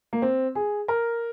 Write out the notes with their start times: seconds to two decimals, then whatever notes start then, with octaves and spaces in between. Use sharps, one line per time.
0.13 A#3
0.22 C4
0.55 G#4
0.88 A#4